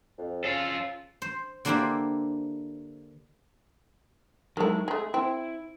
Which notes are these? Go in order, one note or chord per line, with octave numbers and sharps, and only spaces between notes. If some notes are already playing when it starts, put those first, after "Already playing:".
F2
C#3 F4 A4
C5
D3 A#3 D4 E4 G4 C5
D#3 F#3 G#3 E4 A4
G#3 A3 G#4
C4 E4